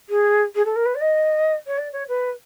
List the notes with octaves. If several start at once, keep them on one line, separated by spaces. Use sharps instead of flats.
G#4
G#4
A4
A#4
B4
D5
D#5
C#5
D5
C#5
B4